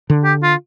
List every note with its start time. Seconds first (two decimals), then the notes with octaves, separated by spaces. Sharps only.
0.10 D3
0.24 G4
0.43 F4